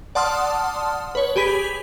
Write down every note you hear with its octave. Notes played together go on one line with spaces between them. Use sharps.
D5 F#5 A5 C6 D#6 F6
B4 C#5
G4 G#4 B5 B6